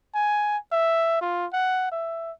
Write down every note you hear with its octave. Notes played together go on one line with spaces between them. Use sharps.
G#5
E5
F4
F#5
E5